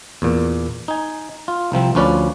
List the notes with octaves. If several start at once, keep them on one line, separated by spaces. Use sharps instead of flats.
E2 A#2
D#4 G#5
F4
C2 C3 F3 C4
D2 F3 C#4 B4 D5